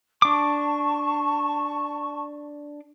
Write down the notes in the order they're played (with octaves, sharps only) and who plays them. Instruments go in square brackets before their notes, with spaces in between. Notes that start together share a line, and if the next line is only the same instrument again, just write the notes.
[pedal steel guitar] D4 D6 [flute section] A5 C#6